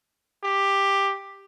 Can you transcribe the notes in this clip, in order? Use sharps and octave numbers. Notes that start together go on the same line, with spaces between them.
G4